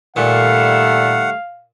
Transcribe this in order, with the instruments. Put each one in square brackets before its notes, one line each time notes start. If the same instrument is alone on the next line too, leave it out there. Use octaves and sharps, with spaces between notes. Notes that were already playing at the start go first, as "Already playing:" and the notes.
[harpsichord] A#2 [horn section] D#3 G3 A3 [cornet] F5 [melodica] F#5